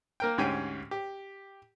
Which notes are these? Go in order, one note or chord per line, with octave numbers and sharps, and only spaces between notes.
A#3 A#4 G5
D2 G#2 C#4 G4 G5 G#5
G4